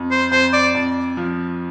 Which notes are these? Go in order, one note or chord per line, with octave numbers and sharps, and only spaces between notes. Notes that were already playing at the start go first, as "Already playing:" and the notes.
Already playing: F2
C5
F2 C5
D5
F2
F3